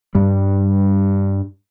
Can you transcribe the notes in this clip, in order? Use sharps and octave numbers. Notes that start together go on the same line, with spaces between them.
G2 G3